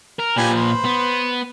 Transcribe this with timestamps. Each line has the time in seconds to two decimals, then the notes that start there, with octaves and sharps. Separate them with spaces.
0.19 A#4
0.37 A#2 F3 G4 B4 G#5
0.56 B4 C5
0.85 B3